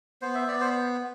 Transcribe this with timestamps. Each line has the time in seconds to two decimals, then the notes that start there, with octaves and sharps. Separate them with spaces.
0.22 B3 C5
0.35 E5
0.48 B3 D5
0.61 C5